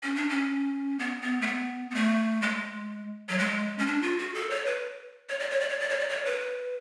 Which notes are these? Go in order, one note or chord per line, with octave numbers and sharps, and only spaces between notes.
C#4
D4
C#4
B3
B3
A3
B3
B3
A3
G#3
F#3
G#3
C#4
D4
F4
F#4
A4
C#5
B4
C#5
D5
C#5
D5
C#5
D5
C#5
D5
C#5
B4